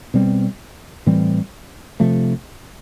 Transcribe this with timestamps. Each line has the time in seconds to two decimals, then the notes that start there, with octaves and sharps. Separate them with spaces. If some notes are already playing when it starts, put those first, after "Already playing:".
0.14 B2 G3 C4
1.06 A2 E3 G3 C4
2.00 C3 F3 A3